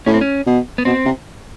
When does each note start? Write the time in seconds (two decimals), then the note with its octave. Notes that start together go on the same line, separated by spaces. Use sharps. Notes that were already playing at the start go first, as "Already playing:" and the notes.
0.06 A2 C#4
0.14 C4
0.21 C#4
0.46 B2
0.78 B3
0.85 B2 C4
1.05 C3